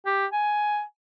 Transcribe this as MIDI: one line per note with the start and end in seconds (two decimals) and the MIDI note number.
0.06 0.26 67
0.33 0.82 80